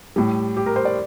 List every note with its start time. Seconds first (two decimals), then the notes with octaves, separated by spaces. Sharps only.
0.16 A2 G3
0.57 G4
0.66 A#4
0.76 C5
0.85 D5